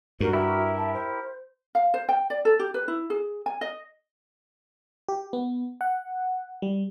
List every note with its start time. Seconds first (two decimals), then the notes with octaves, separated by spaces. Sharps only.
0.20 G2 F#4 A#4
0.33 E4 G4 A#4 E5
0.77 A5
0.93 C5
1.75 F5
1.94 C5
2.09 G5
2.30 D5
2.45 A4
2.59 G4
2.74 B4
2.88 E4
3.10 G#4
3.46 G#5
3.61 D#5
5.08 G4
5.33 B3
5.81 F#5
6.62 G3